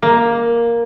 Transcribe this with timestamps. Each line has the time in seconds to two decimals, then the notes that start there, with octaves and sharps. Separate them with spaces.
0.02 A#3